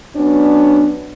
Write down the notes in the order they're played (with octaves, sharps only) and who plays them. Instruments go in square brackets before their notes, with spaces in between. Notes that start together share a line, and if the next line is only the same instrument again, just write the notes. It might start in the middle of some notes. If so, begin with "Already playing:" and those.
[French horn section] F#3 B3 C#4 D4